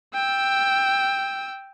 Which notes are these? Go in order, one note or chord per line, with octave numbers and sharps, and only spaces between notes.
G5 E6